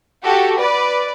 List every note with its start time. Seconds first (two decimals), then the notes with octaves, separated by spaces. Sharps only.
0.23 F#4 G4 A4
0.59 B4 D5